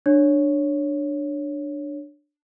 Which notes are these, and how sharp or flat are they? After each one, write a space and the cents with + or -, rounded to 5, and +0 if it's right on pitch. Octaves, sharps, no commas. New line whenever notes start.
D4 +10 C#5 +0